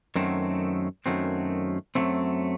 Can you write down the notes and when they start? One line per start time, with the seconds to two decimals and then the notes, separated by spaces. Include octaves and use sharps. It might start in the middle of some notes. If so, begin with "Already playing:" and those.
0.16 F#2 D#3 F#3 A3 C4
1.06 F#2 D#3 F#3 A3 C4
1.95 F#2 D#3 F#3 A3 C4